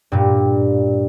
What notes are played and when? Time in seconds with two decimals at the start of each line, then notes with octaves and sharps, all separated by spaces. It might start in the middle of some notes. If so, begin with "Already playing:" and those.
0.12 G2 A#2